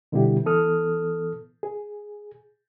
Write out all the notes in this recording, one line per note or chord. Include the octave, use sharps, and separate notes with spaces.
B2 D3 G3 B3 E4 G4
E3 B3 A4 D#6 F6
G#4